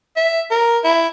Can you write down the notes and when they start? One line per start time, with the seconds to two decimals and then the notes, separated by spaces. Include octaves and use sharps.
0.16 E5
0.51 A#4
0.84 E4